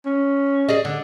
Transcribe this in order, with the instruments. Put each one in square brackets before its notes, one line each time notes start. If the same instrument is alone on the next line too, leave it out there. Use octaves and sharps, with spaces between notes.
[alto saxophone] C#4
[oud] G#4 D5 D#5
D3